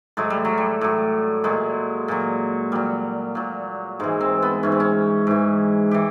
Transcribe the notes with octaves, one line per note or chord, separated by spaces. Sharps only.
A2 F#3 G#3
G3
F#3
G3
A2 F#3
A#2 F#3 G#3
A#2 F#3
A#2 F#3 G3
A#2 F#3
G#2 E3 G#3
C4
B3
G#2 E3 C#4
C4
C#4
G#2 E3
E3 G4